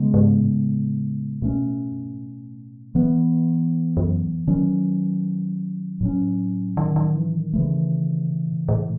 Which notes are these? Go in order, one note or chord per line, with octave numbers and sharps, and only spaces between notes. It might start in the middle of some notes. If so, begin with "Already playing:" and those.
Already playing: C#3 G#3 B3
G#2
A2
B2 A3 C#4
F#2
G#2
A2
E3 B3
F#2
D#3 F#3 C#4
A2 F#3 C#4
D#3
D#3
E3
D#3
C#3 E3 A3
B2
A2
A2